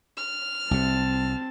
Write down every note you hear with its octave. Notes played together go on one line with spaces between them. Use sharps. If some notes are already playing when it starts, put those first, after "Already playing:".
F6
C2 C3 C4 A5